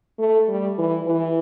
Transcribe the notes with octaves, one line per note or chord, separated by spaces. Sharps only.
A3
G3
E3
E3